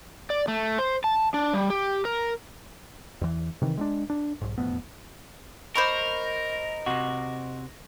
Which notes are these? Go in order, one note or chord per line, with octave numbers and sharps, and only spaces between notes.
D5
A3
C5
A5
D4
G3
G4
A#4
E2 E3
C3 D#3 E3
G#3 C4 D4
D4
B1 G#2
E1 F2 A2 B3
A#4 C5 D#5 B5 C#6
C3 F#4